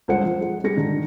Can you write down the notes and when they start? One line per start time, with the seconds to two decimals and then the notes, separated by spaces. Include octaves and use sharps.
0.08 C#2 G2 C5 F#5 C#7
0.24 F3
0.41 G#3 F#5
0.64 G3 G#4 A#6 C#7
0.77 G#2 D3 D#3